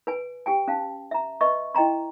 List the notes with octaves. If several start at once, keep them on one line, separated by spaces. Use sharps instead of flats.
B4 G#5
G4 G5 G#5
C#4 F5 A5
E5 A#5
B4 D#5 E5 C#6
E4 D#5 G5 A#5 C6